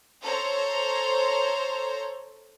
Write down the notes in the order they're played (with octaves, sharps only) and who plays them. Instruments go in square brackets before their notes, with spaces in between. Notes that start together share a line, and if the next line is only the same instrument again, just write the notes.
[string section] A4 C5 C#5 A#5